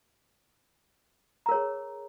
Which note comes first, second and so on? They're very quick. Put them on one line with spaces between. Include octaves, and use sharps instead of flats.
A#5 A#4 C#5 G#4